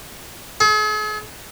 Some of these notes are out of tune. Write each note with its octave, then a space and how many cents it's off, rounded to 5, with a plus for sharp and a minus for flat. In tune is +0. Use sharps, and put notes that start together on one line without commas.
G#4 +45